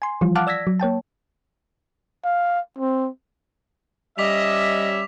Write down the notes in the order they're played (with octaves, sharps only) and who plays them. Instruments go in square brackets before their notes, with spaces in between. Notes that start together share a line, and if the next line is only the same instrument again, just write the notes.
[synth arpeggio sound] G#5 C6
E3 F3 G3 F4
F5 F#5 A5 D6 F6 F#6
D5 E6 G#6 A#6 B6
F#3
A#3 C#5 G5 A5
[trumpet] F5
C4
[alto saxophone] G3 [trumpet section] C#4 E5 [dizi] D#5 [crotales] D6 B6 F7